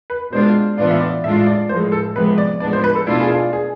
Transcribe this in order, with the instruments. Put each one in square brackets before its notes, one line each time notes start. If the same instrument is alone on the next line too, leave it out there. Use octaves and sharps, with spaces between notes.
[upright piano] B4
[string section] B2 G#3 D4 F4 [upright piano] C5
[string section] A2 E3 B3 D4 F4 [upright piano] D5
[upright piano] E5
D5
[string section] A2 G#3 D4 F4 [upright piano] E5
[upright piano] D5
[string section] A2 F3 G#3 [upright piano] C5
[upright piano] A4
[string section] C3 F3 G#3 B3 [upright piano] B4
[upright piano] D5
[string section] A2 F3 G#3 B3 D4 [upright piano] D5
[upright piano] C5
B4
A4
[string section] B2 A3 D4 F4 [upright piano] E4
[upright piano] G#4
F4
G#4